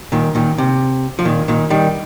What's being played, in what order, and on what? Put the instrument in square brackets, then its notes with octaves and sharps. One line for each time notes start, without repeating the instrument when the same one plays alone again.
[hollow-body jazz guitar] A#2 D#3
A#2 D#3
C3
F3
A#2 D#3
A#2 D#3
D#3 G3